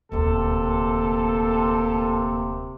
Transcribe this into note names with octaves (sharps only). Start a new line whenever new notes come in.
D#1 D2 C3 A#3 A4